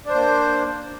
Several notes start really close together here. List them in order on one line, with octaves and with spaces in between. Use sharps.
D4 C5 A#3